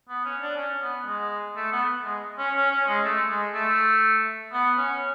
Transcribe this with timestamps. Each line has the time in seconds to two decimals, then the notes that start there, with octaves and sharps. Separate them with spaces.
0.09 B3
0.25 C#4
0.42 D4
0.57 C#4
0.82 B3
1.07 G#3
1.56 A3
1.72 B3
2.05 G#3
2.38 C#4
2.56 C#4
2.71 C#4
2.88 G#3
3.05 A3
3.29 G#3
3.54 A3
4.52 B3
4.77 C#4